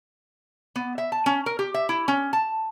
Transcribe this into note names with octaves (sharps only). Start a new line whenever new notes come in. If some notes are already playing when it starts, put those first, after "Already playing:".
B3
E5
A5
C#4
A#4
G4
E5
E4
C#4
A5